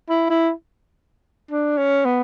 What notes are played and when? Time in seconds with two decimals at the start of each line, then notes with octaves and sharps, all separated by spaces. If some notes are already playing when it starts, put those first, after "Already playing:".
0.09 E4
0.29 E4
1.51 D4
1.77 C#4
2.05 B3